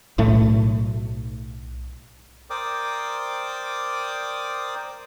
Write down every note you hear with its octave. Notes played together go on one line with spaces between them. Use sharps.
B1 A2 A3
A#4 C5 D5 G5 D6 D#6